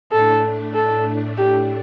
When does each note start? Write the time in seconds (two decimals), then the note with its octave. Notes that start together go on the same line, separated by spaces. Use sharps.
0.12 A2 A3 D4 A4
0.75 A4
1.38 G4